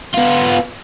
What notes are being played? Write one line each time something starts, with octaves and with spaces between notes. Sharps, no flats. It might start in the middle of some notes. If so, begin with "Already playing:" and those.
B3 F4